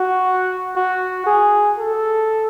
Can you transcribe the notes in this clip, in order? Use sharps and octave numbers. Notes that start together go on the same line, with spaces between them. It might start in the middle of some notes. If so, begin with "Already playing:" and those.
Already playing: F#4
F#4
G#4
A4